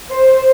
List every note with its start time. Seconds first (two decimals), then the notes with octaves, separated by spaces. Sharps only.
0.10 C5